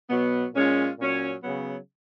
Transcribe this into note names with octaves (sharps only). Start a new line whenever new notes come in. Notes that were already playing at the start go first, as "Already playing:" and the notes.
B2 F#3 B3
A#2 G#3 C#4 F4
A#2 F#3 C#4
C#3 F#3 B3